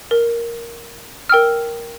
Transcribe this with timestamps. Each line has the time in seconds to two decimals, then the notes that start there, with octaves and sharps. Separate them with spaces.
0.11 A#4
1.29 A#4 G5 E6 F6